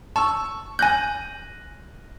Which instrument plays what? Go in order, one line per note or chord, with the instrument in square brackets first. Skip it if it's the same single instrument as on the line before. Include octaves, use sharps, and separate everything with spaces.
[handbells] A5 [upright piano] C#6 E6
[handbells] G#5 G6 [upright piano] F#6 A#6 D#7